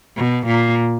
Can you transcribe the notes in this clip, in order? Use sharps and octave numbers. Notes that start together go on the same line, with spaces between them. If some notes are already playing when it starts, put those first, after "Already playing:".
B2
A#2